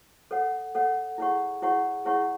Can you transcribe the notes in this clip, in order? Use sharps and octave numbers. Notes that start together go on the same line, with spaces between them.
A4 C#5 F#5
A4 C#5 F#5
E4 G#4 C#5 F#5 C#6
E4 G#4 C#5 F#5 C#6
E4 G#4 C#5 F#5 C#6